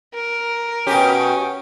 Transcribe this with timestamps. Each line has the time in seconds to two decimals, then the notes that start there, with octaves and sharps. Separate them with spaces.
0.14 A#4
0.87 B2 C#4 G4